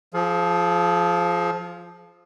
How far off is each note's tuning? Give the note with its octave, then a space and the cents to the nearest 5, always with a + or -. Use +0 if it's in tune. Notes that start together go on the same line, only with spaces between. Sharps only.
F3 +0 G#4 +35